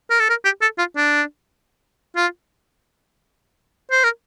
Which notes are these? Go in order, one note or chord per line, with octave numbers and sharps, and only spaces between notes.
A#4
A4
A#4
G4
A4
F4
D4
F4
C5
A#4